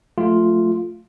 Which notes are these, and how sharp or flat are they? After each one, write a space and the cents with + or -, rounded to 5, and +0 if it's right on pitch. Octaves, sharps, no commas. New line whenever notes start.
F3 +40 A3 +0 F4 +0